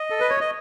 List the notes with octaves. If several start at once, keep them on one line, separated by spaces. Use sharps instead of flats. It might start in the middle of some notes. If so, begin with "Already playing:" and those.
Already playing: D#5
A4
B4
C#5
D#5